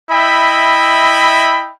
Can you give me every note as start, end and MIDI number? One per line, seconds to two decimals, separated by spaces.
0.10 1.70 64
0.10 1.70 75
0.10 1.70 76
0.10 1.70 79
0.10 1.70 83